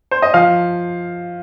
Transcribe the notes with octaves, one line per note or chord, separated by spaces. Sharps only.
C5
D#5
F3 F5